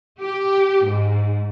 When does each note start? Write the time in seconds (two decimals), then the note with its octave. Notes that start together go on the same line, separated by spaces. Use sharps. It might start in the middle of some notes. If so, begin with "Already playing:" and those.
0.19 G4
0.83 G#2